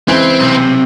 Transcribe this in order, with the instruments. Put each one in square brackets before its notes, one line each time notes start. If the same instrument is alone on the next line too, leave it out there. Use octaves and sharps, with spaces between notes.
[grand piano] C#2 E3 [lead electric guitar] C4
[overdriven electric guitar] B1 C3